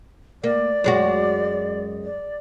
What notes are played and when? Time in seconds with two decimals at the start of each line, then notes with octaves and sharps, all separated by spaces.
0.44 A#3 D5
0.84 F#2 G#3 F#4
2.04 D5